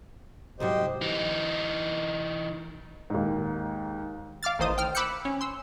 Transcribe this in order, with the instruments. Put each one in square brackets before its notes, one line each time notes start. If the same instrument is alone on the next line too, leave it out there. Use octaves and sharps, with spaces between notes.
[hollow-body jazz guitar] C2 G#2 F#3 [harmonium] G4 C5 D#5
[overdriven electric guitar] E3 D#4
[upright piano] D#2 G#2
[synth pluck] F5 D6 F6 A6
A1 D#3 C5 D#6
G5 F6
B5 D6 E6 F#6 G6 C#7
C#4
C6 E6